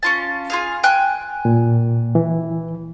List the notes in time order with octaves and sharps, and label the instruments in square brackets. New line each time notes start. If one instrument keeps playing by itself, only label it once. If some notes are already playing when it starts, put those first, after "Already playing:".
[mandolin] C#4 F4 A5
F4 G#4 F5
G5 G#5 F#6
[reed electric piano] A#2
E3